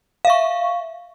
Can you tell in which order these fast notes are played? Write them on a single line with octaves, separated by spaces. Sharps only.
F5 E5 C#6